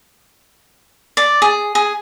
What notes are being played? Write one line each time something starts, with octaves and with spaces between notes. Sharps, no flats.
D5
G#4
G#4